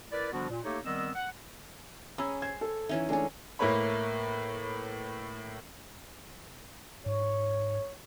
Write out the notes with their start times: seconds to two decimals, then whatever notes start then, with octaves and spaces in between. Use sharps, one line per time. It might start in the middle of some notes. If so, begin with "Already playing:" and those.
0.12 E4 A#4 B4 D5
0.32 D3 F3 G3 B3 D4 F#4
0.50 A#2
0.64 A3 A#3 D#4 G4 A4 C#5
0.84 D#3 G3 B3 C4 D#5 E6
1.15 F#5
2.18 C#4 G#4 A#5 B5 E6
2.42 C5 G#6
2.61 A4
2.89 E3 C#4 D#4 E5
3.09 G#3 A3 C#4 D4 G#5
3.59 A2 A#3 E4 B4 C#5 B5
7.06 G#2 C#5